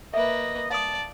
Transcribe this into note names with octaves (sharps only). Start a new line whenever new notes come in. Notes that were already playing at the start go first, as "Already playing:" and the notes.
A#3 B4 D#5 E5
D5 F5 A5 D#6